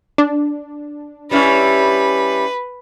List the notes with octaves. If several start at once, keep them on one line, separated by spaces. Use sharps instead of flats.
D4
G3 C#4 E4 B4